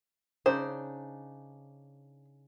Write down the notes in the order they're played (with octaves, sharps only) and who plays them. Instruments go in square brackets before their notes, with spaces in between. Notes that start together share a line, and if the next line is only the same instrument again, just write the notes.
[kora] C#3 D4 D#4 [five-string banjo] C5